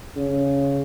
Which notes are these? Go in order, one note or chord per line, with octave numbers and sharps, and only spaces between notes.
C#3